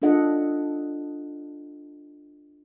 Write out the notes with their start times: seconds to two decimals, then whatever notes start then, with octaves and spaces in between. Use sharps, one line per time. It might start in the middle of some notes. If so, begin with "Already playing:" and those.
0.02 D4 F4 A4 D#5 F#5